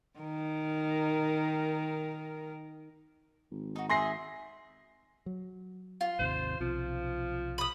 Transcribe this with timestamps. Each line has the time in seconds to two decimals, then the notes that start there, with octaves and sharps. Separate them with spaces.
0.20 D#3 A#4
3.51 G#1
3.76 D#4 F#4
3.89 G#4 C5 D#5 E5 C6 A#6 C7
5.26 F#3
6.01 F4
6.19 G#1 D#2 C3 C5
6.60 B1 C3 F3
7.58 B5 D#6